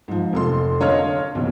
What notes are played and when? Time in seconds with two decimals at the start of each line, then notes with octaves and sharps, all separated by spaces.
0.08 G#2 F3
0.33 F1 A4 C6
0.80 D3 C#5 D#5 F5 C6 F6
1.35 F#1 B1